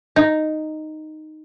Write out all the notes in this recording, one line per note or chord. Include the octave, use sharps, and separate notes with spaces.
D#4